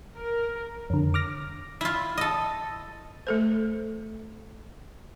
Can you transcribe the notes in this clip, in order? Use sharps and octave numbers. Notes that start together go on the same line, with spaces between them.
A#4
F2 D3
D6 F6 A#6
E4 F4
A4 D#5
A3 A4 C5